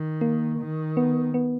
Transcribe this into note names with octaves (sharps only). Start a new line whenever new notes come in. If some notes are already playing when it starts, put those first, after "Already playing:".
Already playing: D#3
A#3
D#3
B3
B3